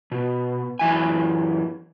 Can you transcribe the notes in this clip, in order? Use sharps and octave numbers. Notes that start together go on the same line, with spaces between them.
B2
F#2 E3 G#5